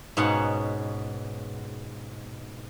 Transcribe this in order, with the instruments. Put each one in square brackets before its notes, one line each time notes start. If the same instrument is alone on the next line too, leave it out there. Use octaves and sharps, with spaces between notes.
[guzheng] G#2 B2 B3 C#4 F#5